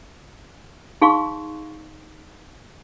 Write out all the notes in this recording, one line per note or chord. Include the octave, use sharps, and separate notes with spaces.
D#4 G#4 F5 C6 C#6